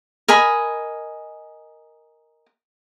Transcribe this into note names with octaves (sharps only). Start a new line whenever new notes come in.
A#4 D#5 G#5 B5